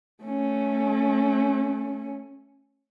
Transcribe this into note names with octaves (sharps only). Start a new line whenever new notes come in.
A3 C#4